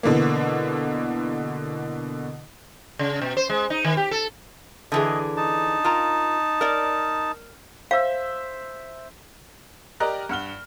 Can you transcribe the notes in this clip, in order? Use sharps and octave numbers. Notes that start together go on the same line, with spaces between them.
B2 D3 E3 A#3
C#3
B2
C5
G#3
D#4
D#3
G4
A4
D3 E3 G#4 D#5
D#4 A5
F4 A#4 A#5
A#4 D5
C5 E5 F5
G4 A#4 D5 D#5 A#5 F#6
G2 F#5 F6 G7